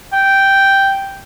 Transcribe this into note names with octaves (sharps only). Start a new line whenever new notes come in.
G5